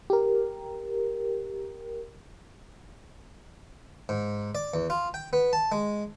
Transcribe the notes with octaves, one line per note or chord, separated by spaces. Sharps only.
G4 A#4
G#2
D5
E2
F4
G5
B3
A5
G#3